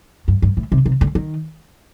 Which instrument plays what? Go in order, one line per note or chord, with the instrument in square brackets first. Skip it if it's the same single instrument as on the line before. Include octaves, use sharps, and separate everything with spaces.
[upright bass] G2
G2
A2
C3
C3
D3
D#3